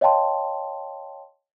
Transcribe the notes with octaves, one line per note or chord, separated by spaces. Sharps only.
C#5 D#5 F5 G5 A5 C6